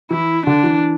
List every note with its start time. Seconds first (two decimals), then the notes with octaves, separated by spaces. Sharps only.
0.11 E3 E4
0.46 D3 D4
0.64 E3